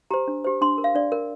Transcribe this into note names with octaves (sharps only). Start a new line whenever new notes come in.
G4 C5 A#5
D4
G4 C5
D4 C6
A#4
F5
D4 D5
A#4